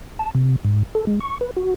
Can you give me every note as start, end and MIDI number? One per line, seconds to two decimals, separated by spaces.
0.19 0.31 81
0.35 0.56 48
0.65 0.83 44
0.95 1.05 69
1.07 1.19 56
1.20 1.38 85
1.41 1.51 71
1.57 1.74 66